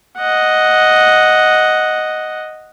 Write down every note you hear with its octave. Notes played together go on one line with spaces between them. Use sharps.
D#5 F#5